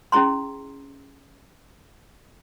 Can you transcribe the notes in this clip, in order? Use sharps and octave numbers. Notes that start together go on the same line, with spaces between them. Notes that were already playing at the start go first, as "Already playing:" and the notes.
C#4 E4 G#4 A#5 C6